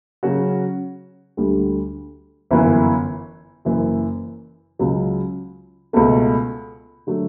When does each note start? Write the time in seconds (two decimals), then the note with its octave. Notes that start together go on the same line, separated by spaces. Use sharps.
0.23 C#3 F#3 C#4 F#4
1.37 D2 D3 G3
2.51 G1 F#2 E3
3.65 F#1 F#2 E3
4.79 C#2 C#3 F#3
5.93 C#2 B2 A3
7.07 D3 F#3 A3